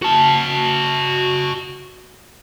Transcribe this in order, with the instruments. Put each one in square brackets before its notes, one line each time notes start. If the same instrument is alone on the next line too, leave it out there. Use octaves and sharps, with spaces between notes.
[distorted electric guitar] F#4 A5